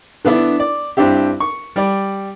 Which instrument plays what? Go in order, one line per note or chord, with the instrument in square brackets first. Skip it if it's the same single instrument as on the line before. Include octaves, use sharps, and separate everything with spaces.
[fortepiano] D3 B3 D4 E4
D5
G2 C4 D4 E4 G4
C#6
G3 D5